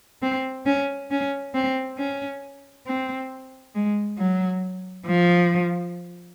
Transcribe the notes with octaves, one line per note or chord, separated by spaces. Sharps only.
C4
C#4
C#4
C4
C#4
C4
G#3
F#3
F3